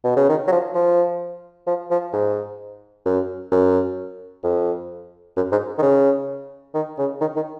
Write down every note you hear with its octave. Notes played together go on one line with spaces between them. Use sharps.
B2
C#3
D#3
F#3
F3
F3
F3
F3
G#2
F#2
F#2
F2
F#2
G#2
D#3
C#3
D#3
C#3
D#3
D#3